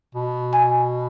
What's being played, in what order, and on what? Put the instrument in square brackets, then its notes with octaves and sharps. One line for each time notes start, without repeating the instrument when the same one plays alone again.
[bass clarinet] B2
[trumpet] G#5